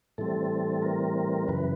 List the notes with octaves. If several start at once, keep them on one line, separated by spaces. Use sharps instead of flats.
A2 E3 G3 C4 A4
A#4
F#2 C#3 E3 B4